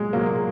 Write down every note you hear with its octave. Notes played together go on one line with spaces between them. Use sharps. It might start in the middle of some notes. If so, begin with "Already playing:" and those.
Already playing: A#2 F#3 G#3
A#2 F#3 A#3